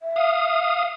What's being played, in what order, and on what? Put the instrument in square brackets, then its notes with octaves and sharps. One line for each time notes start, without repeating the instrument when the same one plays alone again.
[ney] E5
[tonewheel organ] F5 D#6